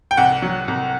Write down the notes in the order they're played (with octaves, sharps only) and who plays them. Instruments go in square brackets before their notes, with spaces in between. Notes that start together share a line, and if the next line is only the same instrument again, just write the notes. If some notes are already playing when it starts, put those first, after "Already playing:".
[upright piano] G5
C2 F#5
F#3
C2